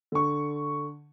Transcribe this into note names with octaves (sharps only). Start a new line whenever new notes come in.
D3 C#6